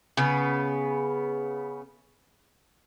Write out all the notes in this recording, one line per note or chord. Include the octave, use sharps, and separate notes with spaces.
C#3 B3